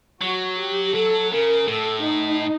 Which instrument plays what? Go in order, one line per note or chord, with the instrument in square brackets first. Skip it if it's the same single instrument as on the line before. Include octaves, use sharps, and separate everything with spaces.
[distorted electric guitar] F#3 [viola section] F#4
[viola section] G4
[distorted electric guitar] F#3 [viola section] A4
[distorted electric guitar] C#3 [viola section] A#4
[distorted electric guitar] A2 [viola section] A4
[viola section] D#4